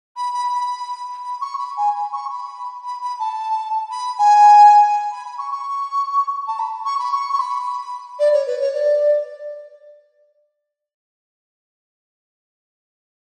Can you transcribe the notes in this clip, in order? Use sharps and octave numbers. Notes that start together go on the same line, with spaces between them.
B5
B5
B5
B5
C#6
B5
G#5
B5
C#6
B5
B5
B5
A5
B5
G#5
B5
B5
C#6
C#6
A5
B5
C#6
B5
C#6
C#6
B5
D5
C#5
B4
C#5
D5